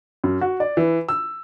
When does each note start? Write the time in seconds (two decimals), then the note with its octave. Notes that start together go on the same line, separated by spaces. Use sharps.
0.24 F#2
0.41 F#4
0.60 D5
0.77 E3
1.09 E6